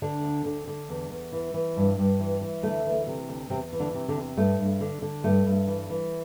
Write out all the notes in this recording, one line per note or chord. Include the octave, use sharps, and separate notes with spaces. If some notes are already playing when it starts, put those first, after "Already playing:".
D2 D3 D4
D2
D3
D3
E2
E2
E3
E3
G2
G2
E3
E3
D2 A3
E3
C3
D2
E2 C3 C4
E3
D3 D4
C3
D3 D4
E2
G2 A3
G2
D3
D3
G2 A3
G2
E3
E3